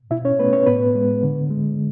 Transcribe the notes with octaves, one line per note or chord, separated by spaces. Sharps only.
B2 E4 E5
C#4 C#5
A3 B3 B4
C#4 C#5
A2 B3 B4
G#3
D3
G#3